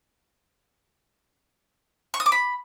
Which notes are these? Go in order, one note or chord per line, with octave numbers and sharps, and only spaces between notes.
C#6
D#6
D6
B5